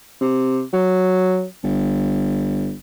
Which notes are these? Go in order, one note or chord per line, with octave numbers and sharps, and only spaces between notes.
C3
F#3
G1